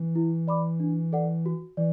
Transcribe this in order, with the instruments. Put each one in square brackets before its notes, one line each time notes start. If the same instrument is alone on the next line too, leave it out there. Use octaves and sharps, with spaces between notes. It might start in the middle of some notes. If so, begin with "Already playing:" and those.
Already playing: [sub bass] E3
[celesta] E4
D5 B5 D6
D4
A4 D5 F#5
F#4
[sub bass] E3 [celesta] D5